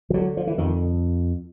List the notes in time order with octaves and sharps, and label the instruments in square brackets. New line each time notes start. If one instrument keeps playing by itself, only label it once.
[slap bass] F3
D3 F#3
F3
E3
F2 D#3